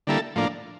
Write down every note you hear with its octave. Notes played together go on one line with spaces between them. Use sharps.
D3 G3 A#3 E4 A4
A2 F3 A#3 D4